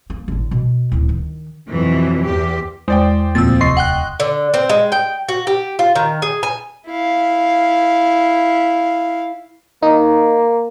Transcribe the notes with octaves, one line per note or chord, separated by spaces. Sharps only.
A#3
A1 D3
B2
D1 E4
D#3
F2 B2 E3 F#3
E2 G4
E2 G#3 C5 D5 G5
D2 A#2 F3 A#3 C4 E6 A6
D1 C3 D#5 C6 C#6 C7
F#5 G5 F#6
D3
C4
G#3
G5
F#4
G4
F4
D#3
G#4
G#5
E4 F5
A#3 D#4